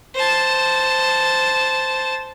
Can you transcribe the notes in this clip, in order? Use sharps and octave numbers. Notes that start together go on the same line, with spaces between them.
C5 A5